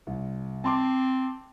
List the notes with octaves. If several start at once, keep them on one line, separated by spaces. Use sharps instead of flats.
C2
C4 A5 C6 D6